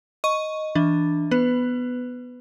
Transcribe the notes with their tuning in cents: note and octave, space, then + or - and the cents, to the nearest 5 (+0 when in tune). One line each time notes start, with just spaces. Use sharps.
D#5 +0 C#6 +0
E3 +0 D4 +0
B3 +0 B4 +20